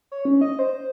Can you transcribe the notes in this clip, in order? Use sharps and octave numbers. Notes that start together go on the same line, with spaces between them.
C#5
C#4
D#5
C5